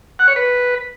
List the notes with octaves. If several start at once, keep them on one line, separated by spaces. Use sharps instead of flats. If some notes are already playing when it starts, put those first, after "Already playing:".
F#5
C#5
B4